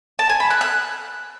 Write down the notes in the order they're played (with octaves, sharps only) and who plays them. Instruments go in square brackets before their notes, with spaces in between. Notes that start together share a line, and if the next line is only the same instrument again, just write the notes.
[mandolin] A5
G#5
B5
F#6
F#6